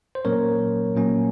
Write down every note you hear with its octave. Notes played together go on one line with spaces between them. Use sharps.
C5
A#2 F#3 A#3 C#4 A#4 C#5
A#2 F#3 A#3 C#4